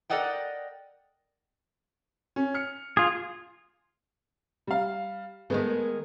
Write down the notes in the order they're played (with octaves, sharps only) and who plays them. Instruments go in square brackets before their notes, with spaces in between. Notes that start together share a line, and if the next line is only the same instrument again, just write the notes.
[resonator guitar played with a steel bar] A4 A#4 D5 D#5 F#5 G5
[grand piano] C#4
F6 C#7
[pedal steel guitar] F4 G#4
[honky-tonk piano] G3 F5
[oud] D#3 G#3 A3 [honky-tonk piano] B3 G#4